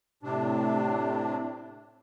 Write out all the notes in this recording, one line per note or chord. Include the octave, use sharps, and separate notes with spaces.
A2 C3 D4